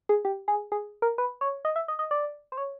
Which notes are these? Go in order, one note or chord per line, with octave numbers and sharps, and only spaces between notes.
G#4
G4
G#4
G#4
A#4
B4
C#5
D#5
E5
D#5
D#5
D5
C5
C#5